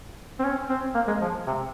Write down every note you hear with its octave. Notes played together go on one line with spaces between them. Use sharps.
C4
C#4
C4
A#3
G#3
F3
C3